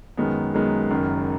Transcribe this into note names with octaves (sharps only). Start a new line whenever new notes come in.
F#2 D#3 G#3 B3
F#2 D#3 G#3 B3
F#1 F#2 D#3